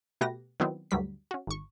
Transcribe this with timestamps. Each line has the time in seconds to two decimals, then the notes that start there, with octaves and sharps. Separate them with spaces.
0.21 B2 A3 G4 B4 A#6
0.60 D#3 F#3 B3 C4 E4
0.91 D2 G2 F#3 G3 B6
1.31 C#4 F#4
1.47 G#1 C#6